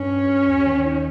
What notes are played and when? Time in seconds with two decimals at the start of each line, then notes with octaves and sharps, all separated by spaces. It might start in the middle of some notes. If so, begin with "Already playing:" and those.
Already playing: G2 C#4
0.12 G2
0.30 G2
0.48 D#2
0.67 D#3
0.85 D#4